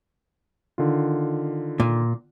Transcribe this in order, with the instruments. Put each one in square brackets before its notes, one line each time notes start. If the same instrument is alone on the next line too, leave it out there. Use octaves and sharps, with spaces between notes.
[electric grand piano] D3 D#3 F4
[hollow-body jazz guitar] A#2